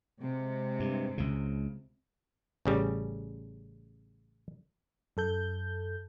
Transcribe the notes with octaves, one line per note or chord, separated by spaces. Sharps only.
C3 G#3
G2
C#2 C#3
A1 C#3 G3
F#2 A4 G6